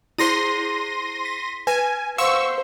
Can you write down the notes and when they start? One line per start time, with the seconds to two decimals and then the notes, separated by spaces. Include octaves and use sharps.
0.18 E4 G#4 C5 C6 A#6 D#7
1.25 B6
1.67 B4 G#5
2.18 C5 F5 F#5 C6 C#6 E6